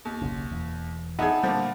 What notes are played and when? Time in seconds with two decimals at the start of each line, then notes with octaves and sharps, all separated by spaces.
0.05 D#2
0.22 F#1 B1 C#3
0.51 E1 E2
1.19 B3 D4 D#4 G#4 E5
1.43 A#2 D3 F3 G3